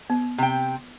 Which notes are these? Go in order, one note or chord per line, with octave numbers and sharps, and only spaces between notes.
B3
C3 G5